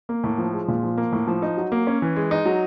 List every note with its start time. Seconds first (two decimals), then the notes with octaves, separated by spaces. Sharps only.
0.09 A#3
0.24 A2
0.38 F3
0.53 G#3
0.68 A#2
0.83 F3
0.97 A#3
1.12 A2
1.27 F3
1.42 D#4
1.57 F#3
1.72 A#3
1.87 C#4
2.02 E3
2.16 G#3
2.31 D#4
2.46 F#3